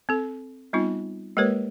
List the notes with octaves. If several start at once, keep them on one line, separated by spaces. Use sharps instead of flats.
C4 A4
G3 B3 C4 D#4 F4
G#3 A#3 G4 A#4 B4 C#5